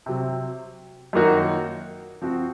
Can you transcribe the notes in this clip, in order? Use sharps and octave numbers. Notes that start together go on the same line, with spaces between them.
C3 F#3 C4
F#2 D#3 A#3 D#4 F#4
F3 C4 F#4